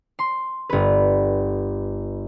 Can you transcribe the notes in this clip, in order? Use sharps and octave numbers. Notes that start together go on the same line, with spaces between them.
C6
G1 B4